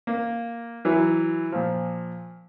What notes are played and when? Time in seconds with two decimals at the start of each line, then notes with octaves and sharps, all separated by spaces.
0.07 A#3
0.85 E3 F#3
1.52 A#2 F3